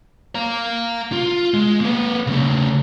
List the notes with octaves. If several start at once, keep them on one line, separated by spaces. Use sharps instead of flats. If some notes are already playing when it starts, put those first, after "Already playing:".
F5 A#5
F4
G#3
A#3 B4
C#3 A3